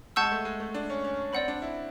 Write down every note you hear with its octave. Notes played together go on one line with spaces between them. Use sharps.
G#3 F#5 A5 C#6 E6 G6
A3
G#3
A3
D4
C#4
C#4
C4 D5 F#5 B5
D4
E4